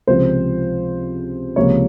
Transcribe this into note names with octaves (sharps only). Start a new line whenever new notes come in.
C#2 C3 F3 C4 C5
C#2 C3 F3 A#3 C#4 C#5